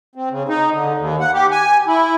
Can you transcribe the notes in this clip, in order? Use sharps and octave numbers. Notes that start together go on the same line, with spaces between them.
C4
C#3
D#4
D3
D#2
F#5
G4
G#5
E4